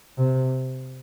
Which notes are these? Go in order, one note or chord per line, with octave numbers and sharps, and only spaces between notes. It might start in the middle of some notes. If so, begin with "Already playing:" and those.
C3